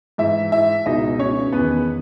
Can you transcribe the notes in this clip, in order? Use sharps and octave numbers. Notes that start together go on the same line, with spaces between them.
G#2 E3 E4 E5
E4 E5
C#2 B2 D#4 D#5
C#4 C#5
E2 D#3 B3 B4